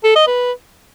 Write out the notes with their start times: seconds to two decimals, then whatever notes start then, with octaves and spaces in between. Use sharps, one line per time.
0.04 A4
0.16 D#5
0.27 B4